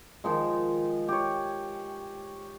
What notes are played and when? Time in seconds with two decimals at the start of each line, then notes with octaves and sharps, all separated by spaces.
0.24 D#3 F3 G#3
1.09 G4 C#5